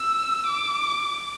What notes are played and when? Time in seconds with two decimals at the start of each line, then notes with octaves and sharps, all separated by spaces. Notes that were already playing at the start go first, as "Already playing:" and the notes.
Already playing: E6
0.47 D6